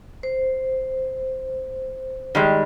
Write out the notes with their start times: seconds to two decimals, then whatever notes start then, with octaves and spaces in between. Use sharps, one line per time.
0.23 C5
2.35 D#3 G3 G#3